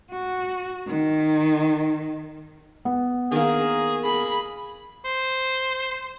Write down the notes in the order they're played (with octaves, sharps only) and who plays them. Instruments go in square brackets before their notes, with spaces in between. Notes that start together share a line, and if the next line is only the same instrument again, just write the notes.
[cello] F#4
D#3
[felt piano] B3
[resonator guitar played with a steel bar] D#3 A#3 [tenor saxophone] G#4
[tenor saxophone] G#4 [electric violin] B5
[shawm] C5